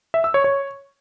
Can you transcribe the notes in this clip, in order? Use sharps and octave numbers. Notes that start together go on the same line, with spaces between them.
E5
E6
C#5
C#5